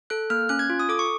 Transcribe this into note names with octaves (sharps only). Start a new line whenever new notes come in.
A4 F#6
A#3 F6
C#4 F#6
G#6
F4
D#6
A4 D6
C#6